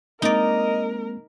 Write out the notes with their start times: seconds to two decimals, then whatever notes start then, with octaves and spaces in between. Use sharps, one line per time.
0.22 G#3 A#3 C4 D#4 A#4 D5 D#5